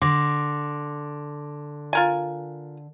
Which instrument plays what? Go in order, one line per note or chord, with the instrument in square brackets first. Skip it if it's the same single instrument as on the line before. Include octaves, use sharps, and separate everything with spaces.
[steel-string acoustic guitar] D3 [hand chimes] C6 D6 A#6
[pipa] F4 A#4 G#5